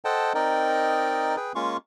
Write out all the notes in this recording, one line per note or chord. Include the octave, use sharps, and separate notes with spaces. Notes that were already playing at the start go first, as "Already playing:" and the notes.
A4 C5 D#5 F#5 G5 A5
C4 D#4 A#4 D5 D#5 G5
G#4 B4 G5
G#3 A#3 C#4 F4 F5 C#6